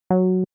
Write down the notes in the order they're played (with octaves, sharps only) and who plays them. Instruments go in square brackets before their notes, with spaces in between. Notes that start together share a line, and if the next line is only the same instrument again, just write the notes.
[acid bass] F#3